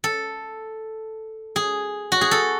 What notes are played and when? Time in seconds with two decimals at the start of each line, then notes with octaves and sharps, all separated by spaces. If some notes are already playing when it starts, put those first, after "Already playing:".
0.04 A4
1.56 G#4
2.12 F#4
2.21 G#4
2.31 A4